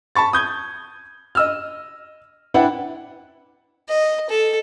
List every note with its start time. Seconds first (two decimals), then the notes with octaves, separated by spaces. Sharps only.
0.16 A5 B5 C#6 A6
0.33 D#6 G6 G#6
1.35 D#5 E6 F6
2.54 D4 E4 B4 F#5 G5
3.89 D#5
4.29 A4